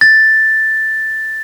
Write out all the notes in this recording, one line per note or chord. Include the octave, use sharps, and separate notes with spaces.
A6